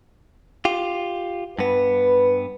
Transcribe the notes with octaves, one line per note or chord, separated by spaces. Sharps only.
F4 G4
G2 B3 B4